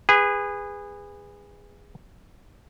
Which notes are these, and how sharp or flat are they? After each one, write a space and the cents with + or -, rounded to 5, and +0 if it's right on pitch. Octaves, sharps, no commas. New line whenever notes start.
G#4 -25 B4 +10